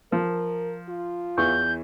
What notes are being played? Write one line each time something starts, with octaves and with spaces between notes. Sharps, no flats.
F3 A#4
F4
E2 E3 C#6 G6